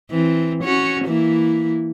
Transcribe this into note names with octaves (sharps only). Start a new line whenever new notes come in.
E3 C4
C#4 F#4 C#5
E3 A#3 E4